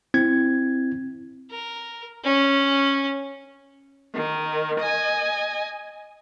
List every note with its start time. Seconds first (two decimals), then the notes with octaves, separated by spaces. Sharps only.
0.14 C4 E4 G#6
1.51 A#4
2.24 C#4
4.13 D#3
4.79 D#5 G#5